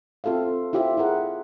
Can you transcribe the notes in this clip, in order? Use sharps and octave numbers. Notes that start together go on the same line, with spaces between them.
C4 F4 A4 E5 F5
E4 F4 G4 C5 E5
E4 G#4 A#4 F#5